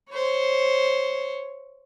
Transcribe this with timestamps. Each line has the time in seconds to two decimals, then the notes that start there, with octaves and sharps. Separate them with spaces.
0.11 C5 C#5